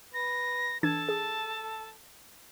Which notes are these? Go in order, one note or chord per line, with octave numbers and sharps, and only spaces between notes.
B4 A#6
E3 D4 A4 A5 G#6
G#4